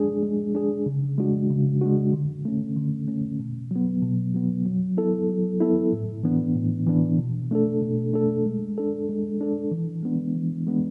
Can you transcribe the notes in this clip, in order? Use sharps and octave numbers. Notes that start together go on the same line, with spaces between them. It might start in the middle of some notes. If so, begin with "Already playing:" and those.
Already playing: G#3 D4 G#4
G#3
D4 G#4
C#3
G#3 D4 F#4
C#3
G#3 D4 F#4
D3
A3 C#4
D3
A3 C#4
B2
F#3 B3
B2
F#3 B3
F#3
B3 E4 A4
F#3
B3 E4 A4
A2
E3 B3 D4
A2
E3 B3 D4
B2
A3 D4 A4
B2
A3 D4 A4
G#3
D4 A4
G#3
D4 A4
E3
G#3 B3 D4
E3
G#3 B3 D4